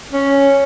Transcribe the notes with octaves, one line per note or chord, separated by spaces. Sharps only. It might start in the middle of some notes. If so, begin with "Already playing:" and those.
C#4